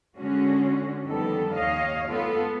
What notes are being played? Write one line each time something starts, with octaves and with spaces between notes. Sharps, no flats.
D3 G#3 C#4 F#4
F2 D#3 G3 B3 A4
D#2 C#5 D#5 F5
G#3 B3 F4 A4